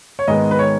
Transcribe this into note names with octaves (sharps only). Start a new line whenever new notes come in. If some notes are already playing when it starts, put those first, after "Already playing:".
C#5
G#2 D#3 G#3 B3 D#5
B4
C#5